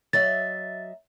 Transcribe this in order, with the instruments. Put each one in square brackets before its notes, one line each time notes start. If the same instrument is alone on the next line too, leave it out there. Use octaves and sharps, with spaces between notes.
[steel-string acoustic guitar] F#3 D#5 E5 [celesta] A6